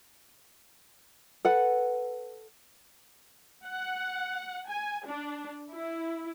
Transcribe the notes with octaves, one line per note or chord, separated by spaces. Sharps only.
A4 B4 F#5
F#5
G#5
D4
E4